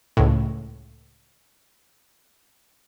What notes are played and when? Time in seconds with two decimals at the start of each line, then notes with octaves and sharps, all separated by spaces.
0.17 C#2 A2